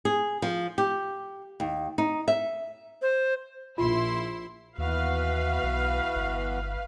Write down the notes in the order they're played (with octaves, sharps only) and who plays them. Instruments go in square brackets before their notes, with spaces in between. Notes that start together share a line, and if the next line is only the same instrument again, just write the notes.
[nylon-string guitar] G#4
F3
G4
D#2
D#4
E5
[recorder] C5
[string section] A#1 E4 C6 [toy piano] F4
[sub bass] D#2 [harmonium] E3 B3 F#4 [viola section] B4 F5
[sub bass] B1
G1